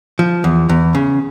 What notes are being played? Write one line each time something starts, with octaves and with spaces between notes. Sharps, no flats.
F3
E2
E2
C#3